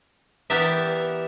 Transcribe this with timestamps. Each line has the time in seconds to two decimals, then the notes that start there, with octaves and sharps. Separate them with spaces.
0.50 E3 B3 G4 A#4 D5 E5